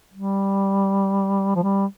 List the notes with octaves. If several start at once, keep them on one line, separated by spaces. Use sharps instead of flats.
G3
F3
G3